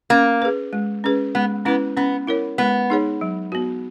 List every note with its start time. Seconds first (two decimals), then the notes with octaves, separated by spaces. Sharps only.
0.10 A#3 C#4
0.42 G#4 B4
0.73 G#3
1.04 C#4 G#4 B4
1.35 G#3 B3
1.65 B3 C#4 E4 B4
1.97 B3 C#4
2.27 E4 A#4 C#5
2.58 G#3 B3
2.90 D#4 G#4 C#5
3.21 F#3
3.52 B3 F#4